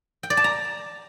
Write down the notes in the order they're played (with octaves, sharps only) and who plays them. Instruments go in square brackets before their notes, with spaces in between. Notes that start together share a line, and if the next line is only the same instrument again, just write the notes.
[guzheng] G5
D5
A5
A#5